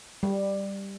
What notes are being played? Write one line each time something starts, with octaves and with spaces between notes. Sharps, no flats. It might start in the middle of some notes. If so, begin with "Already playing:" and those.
G3